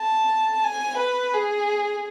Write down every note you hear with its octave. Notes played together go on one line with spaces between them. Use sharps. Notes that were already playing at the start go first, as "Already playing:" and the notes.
Already playing: A5
G#5
B4
G#4